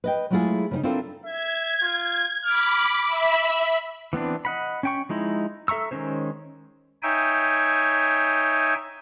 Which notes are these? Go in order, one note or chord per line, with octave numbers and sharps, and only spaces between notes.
B4 D#5 G5
F#3 G#3 A3 E4 F4 G#4
C#3 B3 D#4
C4 D4 E4 F4 A4 A#4
E5 G#6
F4
B5 D6 F6
E5 B5 E6
E3 B3 C4 D4
D#5 F#5 B5
C#4 G5 C#6
F3 G#3 D#4 E4
A4 E5 A#5 C#6 E6
D#3 G#3 C#4 C5 C#5
D#4 C#5 E5 G5 G#5